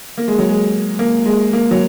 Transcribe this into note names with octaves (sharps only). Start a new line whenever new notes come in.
A#3
G#3
F#3
G#3
A#3
G#3
A#3
F#3